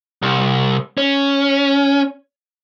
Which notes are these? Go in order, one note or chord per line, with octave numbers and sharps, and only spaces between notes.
C2
C#4